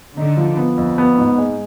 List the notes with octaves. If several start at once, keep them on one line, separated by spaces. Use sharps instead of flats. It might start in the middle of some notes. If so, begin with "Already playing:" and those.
D3 D#4
F3
B3
F2
B3
G#2
G#3